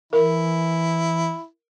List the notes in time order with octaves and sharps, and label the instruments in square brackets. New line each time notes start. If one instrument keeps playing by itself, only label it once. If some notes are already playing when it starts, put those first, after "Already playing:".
[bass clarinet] E3 [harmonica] E4 [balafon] A#4